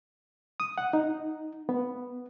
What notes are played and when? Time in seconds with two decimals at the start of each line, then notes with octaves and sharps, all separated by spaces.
0.60 D#6
0.78 F#5
0.93 D#4
1.69 B3